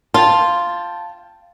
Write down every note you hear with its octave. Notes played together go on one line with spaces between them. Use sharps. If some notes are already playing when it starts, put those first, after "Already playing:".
F4 F5 G5 A5